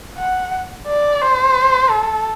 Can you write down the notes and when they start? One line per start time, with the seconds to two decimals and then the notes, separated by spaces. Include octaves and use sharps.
0.18 F#5
0.87 D5
1.22 C5
1.90 A4